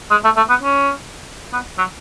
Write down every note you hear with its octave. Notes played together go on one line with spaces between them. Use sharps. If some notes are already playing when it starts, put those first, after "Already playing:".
G#3
A3
A3
B3
C#4
B3
F#3